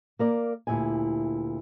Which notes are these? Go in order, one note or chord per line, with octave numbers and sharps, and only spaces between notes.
A#3 A#4 D5
D2 A#2 D#3 E4 G4 G#5